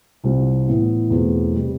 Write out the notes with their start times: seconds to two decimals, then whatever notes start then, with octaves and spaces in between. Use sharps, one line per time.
0.24 C2 C3 G3 C4 F4
0.68 A2 E3 B3 E4
1.10 E2 B2 A3 C4 F4
1.54 C3 G3